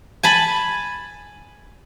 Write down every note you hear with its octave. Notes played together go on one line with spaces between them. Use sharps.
G#5 A5 B5